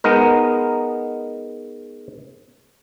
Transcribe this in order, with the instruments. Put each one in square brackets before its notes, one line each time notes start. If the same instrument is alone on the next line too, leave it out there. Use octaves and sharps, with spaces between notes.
[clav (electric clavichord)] G#3 B3 D#4 A#4